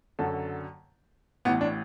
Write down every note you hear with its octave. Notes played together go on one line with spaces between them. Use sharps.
F#1 F#2 D3 F#3 A4
A1 A2 E3 B3
D4